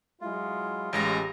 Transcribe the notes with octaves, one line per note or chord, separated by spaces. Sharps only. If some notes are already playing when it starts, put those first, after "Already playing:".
F#3 G#3 E4 F4
A1 G#3 C#4 G4 A#5 A#6